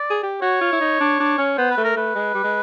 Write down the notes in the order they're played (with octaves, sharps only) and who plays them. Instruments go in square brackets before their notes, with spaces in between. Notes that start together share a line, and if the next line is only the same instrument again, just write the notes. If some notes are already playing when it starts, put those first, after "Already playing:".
Already playing: [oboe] D5
[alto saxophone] G#4
G4
[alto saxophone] F#4 [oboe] C#5
[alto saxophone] F4
E4
D#4
D4
D4
C#4
[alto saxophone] B3 [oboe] C5
[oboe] B4
[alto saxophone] A3
[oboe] A#4
[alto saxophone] A3 [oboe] B4
[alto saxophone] G#3
G3
G#3